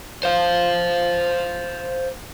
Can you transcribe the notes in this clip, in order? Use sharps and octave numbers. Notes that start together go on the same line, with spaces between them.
C5 F5